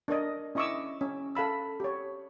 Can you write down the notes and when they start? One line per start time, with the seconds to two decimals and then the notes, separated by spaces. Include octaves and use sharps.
0.08 D4 A#4 D5 D#5
0.55 C#4 E4 D#5 C#6 D6 E6
1.01 C#4
1.35 A4 F5 B5 E6
1.80 G4 C#5